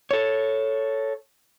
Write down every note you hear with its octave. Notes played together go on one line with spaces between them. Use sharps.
A4 C#5